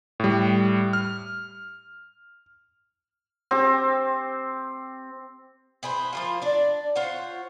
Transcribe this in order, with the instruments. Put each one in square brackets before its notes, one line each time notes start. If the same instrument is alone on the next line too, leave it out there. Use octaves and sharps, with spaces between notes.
[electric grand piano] A2 G3
F6
[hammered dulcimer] C4 G4
[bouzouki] E4 G#4 B4 C5
F3 A#3 F4
D4 D5
F4 C5 C#5 F#5